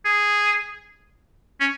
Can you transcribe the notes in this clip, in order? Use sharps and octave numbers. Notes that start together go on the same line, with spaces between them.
G#4
C#4